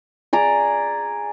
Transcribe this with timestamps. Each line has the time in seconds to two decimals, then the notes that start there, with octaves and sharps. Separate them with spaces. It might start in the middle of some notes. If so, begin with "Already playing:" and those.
0.33 G#4 D5 A#5